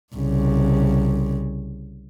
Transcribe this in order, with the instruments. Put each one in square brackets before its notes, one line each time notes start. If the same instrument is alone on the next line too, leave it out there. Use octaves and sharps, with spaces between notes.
[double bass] C2 C#3